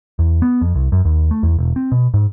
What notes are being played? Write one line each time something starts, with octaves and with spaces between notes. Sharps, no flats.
E2
B3
F2
C2
F#2
D#2
A3
E2
E1
C4
B2
G#2